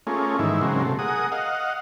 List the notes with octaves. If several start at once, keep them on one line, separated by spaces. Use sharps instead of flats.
A3 A#3 C#4 F4 G#4
G#2 D#3 E3 E4
C#3 F#3 G#3 A#3 C4
C3 A3
G#4 A#4 F#5 D#6
D#5 F5 F#5